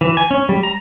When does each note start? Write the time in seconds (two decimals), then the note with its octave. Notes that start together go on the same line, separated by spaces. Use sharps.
0.01 E3
0.17 G#5
0.31 C#4
0.49 G3
0.63 A#5